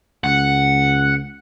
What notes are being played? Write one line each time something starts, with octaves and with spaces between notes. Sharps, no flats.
C#2 F#5